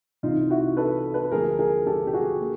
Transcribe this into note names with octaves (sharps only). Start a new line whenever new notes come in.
C2 C3 E3 D#4 F4
E4 F#4
A4 B4
A4 B4
D2 D3 F3 A#3 G#4 A#4
G#4 A#4
G4 A4
G4
F#4 G#4
A#3